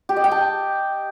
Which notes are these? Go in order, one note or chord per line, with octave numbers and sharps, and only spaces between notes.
G4
D#5
G5
A5